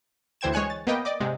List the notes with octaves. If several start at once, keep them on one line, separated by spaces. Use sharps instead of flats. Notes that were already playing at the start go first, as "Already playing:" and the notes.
D2 E3 C5 G5 G#6 E7
G#3 C#5 G#5 F#6 C#7
A6
A#3 B3 B4 D#5 G5
D5 D#5 D6
G#2 C3 G#3